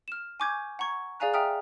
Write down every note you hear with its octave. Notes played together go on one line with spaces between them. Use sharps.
F6 E7
G#5 C#6 D6 G6 G#6
F#5 A#5 C#6 G#6
G#4 D5 F5 G#5 A#5 F#6
E5 G5 A#5 D#6 F6